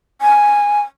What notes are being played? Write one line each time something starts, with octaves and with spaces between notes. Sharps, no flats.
G#5